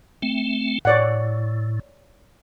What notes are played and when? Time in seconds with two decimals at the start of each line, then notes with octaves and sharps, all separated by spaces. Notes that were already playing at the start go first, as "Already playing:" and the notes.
0.22 A3 C4
0.85 A2 C#5 D5 F#5